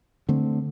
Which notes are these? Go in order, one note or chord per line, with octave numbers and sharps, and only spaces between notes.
D3 A3 C4